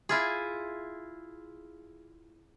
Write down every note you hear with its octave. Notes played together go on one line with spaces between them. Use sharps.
E4 F4 G#4